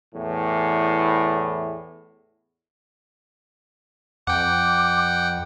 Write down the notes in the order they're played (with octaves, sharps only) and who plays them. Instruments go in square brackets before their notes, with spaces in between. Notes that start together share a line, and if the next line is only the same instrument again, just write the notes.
[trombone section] E2 A2 E3
[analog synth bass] F2 [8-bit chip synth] F#5 G5 [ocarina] D6